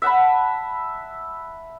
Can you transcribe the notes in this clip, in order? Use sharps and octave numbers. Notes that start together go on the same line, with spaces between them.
E5 F#5 A5 B5